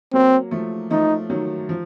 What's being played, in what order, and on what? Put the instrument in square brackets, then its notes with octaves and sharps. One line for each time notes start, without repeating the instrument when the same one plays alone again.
[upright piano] F#3 A#3 [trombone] C4
[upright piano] F3 A3
[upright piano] F3 A3 [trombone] D#4
[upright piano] D#3 F#3
F3